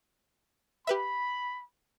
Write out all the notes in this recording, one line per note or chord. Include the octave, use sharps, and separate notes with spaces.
G4 B4 E5 B5